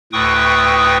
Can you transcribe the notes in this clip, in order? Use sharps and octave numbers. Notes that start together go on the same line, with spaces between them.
D2 A2 B4 G5 C#6 D#6